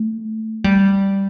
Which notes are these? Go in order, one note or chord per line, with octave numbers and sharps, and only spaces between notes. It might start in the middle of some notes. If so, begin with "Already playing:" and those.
Already playing: A3
G3